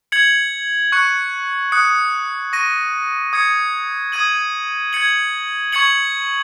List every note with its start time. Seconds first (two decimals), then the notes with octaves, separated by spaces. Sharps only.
0.12 G#6 C#7 F#7
0.92 C#6 F#6 C#7
1.72 D#6 F#6 C#7
2.53 C#6 A#6 D#7
3.33 D#6 G#6 C#7
4.12 D#6 G#6 D#7 F#7
4.93 G#6 C#7 F#7
5.72 C#6 G#6 C#7 F#7